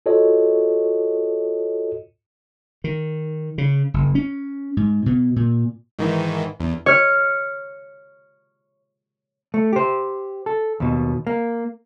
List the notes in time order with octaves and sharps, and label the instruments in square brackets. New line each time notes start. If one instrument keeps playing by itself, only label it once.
[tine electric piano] F4 F#4 A4 C#5 D#5
[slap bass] D#3
C#3
F#1
C#4
G#2
B2
A#2
[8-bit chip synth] G#2 D#3 E3
E2
[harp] C#5 F6
[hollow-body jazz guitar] A3
G4 C5
A4
D#2 B2
A#3